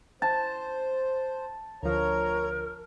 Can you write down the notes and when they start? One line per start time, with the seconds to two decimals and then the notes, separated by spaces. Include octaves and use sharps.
0.22 C5 A5
1.83 D2 F3 A#4 C#5 A#5